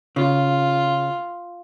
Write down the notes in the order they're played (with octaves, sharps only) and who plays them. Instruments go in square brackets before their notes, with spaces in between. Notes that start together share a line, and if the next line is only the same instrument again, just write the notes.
[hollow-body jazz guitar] C#3 [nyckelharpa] F4